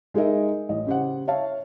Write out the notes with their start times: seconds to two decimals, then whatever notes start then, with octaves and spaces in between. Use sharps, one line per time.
0.14 G#3 D#4 G#4 A#4 D#5 E5
0.69 A1 D#5
0.87 C#3 G4 C5 F#5
1.28 C#5 E5 F5 A5